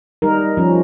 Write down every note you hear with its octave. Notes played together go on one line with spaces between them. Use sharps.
G3 D#4 A#4
F3 C#4